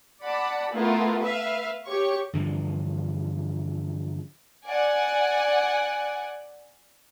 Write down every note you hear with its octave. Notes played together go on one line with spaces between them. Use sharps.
D5 F#5 A5 B5
A3 B3 E4 F4 A#4
B4 E5 F5
G4 C#5 C#6
G2 D3 E3 F3
D5 F#5 G#5